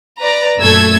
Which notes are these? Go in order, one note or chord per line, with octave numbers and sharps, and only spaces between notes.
B4 D5 A#5
F#2 A#2 A3 A4 E6 G#6